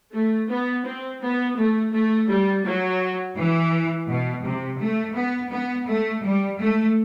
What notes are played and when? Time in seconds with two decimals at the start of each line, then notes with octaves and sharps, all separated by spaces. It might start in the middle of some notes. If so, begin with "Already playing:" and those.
0.13 A3
0.49 B3
0.86 C4
1.21 B3
1.57 A3
1.93 A3
2.28 G3
2.64 F#3
3.36 E3
4.08 B2
4.44 C3
4.80 A3
5.15 B3
5.50 B3
5.87 A3
6.23 G3
6.59 A3